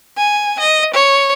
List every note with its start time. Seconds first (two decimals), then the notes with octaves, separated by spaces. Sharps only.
0.17 G#5
0.59 D#5
0.94 C#5